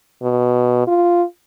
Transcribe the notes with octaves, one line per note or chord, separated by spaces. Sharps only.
B2
F4